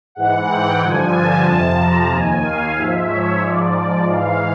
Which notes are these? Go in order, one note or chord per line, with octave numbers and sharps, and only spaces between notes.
G#2 E3 F#5
G5
G2 D3 F3 G#5
A5
F2 C3 F3
A#5
D#2 D#3 G#5
F5
G#2 F3 E5
C#5
G#2 F3 D5
G#2 E3 F5